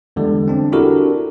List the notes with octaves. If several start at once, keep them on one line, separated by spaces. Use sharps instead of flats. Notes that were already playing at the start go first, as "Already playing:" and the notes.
E2 D3 G3 G#3
C4 D4
D4 E4 F#4 G4 A4 A#4